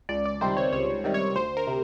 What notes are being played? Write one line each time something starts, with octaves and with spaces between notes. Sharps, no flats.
C#2 D5
D5
C3 D#3 G3 C4 C5
C#5
C#2 C#5
C3 D#3 G3 C4
C#5
D2 C5
A#4
C3